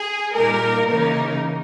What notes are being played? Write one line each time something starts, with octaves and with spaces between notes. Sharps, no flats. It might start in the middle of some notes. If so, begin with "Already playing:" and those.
Already playing: G#4
A#2 G3 A#3 D#4 A#4
C#3 E3 A#3 D#4 A#4